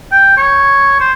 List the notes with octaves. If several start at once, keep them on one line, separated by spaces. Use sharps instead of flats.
G5
C#5
C5